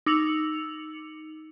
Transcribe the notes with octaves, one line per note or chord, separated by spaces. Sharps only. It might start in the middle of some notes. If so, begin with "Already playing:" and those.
D#4 D6 E6 C#7 F7 F#7